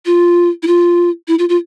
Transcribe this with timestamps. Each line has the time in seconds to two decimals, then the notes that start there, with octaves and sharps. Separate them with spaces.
0.06 F4
0.63 E4
0.67 F4
1.28 E4
1.39 F4
1.49 F4